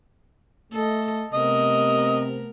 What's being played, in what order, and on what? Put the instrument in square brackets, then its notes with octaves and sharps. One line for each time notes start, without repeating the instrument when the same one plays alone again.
[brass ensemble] A3 [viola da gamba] A4 D#5
[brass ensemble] C3 [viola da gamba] A3 B3 A#4 [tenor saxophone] D#5